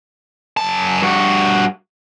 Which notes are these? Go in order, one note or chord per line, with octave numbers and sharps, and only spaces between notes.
F#2 A5
G2 F#4